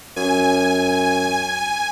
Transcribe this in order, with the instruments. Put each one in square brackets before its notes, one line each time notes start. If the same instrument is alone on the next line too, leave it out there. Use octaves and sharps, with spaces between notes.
[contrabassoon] F#2 [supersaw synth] G#5